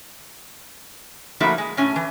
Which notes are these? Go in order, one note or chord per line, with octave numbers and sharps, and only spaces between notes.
F3 A3 A#3 D#4 E4 F#4
G#3
A2 C#4
E3